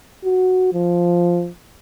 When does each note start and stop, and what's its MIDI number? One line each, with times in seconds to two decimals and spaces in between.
0.25 0.70 66
0.73 1.49 53